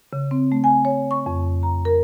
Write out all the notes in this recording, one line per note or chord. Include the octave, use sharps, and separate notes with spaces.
C#3
C4
A3
G#5
C#5
C#6
F2
A#5
A#4